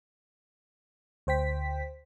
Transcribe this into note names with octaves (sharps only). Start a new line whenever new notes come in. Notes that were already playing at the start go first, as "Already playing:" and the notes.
D2 C5 G5 B6